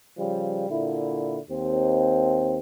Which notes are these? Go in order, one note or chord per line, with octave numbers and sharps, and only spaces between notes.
C#3 F3 G3
A#2 D3 E4
D#2 C4